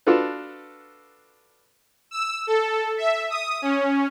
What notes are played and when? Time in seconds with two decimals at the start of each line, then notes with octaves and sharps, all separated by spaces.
0.07 D4 F4 F#4 A4 B4
2.11 E6
2.47 A4
2.97 E5
3.30 D#6
3.62 C#4